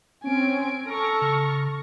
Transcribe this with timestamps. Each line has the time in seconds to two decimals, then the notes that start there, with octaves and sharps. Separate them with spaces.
0.24 C4 C#4 G#5 D7
0.87 A4 A#5 C#6 F6
1.22 C#3